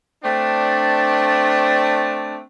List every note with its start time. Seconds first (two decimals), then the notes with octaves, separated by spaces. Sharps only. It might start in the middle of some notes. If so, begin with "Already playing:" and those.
0.24 A3 C4 D4